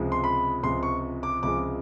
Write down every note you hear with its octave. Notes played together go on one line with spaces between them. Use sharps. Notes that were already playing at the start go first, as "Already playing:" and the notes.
Already playing: C#2 C3 F3 G#3
C6
B5
C#2 C3 F3 G#3 C6
C#6
D6
C#2 C3 F3 G#3 D6